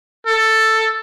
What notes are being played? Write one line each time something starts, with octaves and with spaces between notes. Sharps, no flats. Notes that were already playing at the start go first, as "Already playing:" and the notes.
A4